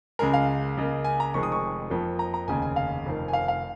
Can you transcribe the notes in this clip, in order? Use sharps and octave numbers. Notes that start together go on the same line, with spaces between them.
C#2 C#3 G#3 A#4
F5
C#2 C#3 A#3
G#5
A#5
F1 F2 D#3 G#3 C#6
D#6
C#6
F2 F3 A#3
A#5
A#5
F1 D#2 C#3 G#5
G#5
F5
F1 F2 D#3
G#5
F5
F5